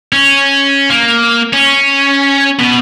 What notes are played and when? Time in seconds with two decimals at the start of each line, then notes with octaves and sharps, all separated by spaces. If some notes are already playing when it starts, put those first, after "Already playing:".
0.13 C#4
0.90 A#3
1.53 C#4
2.59 B2